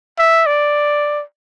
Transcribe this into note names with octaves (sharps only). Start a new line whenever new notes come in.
E5
D5